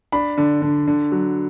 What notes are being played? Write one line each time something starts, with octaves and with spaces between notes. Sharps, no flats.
D4 B5
D3
D3
D3
F#3